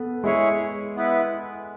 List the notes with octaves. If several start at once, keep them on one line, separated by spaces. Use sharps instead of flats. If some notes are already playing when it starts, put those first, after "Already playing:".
Already playing: B3 A4 B4
G#3 E4 G#4 C#5
B3 E4 B4